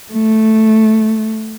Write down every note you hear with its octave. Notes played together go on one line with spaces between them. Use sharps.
A3